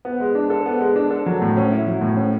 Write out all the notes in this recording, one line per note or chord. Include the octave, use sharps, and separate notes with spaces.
B3
G#3
D4
A4
B3
G#3
D4
A4
F#3
A2
C#4
E4
F#3
A2
C#4